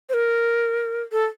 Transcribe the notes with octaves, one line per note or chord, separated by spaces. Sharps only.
C5
A#4
A4